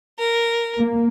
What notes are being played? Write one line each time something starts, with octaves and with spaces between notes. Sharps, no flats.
A#4
A#3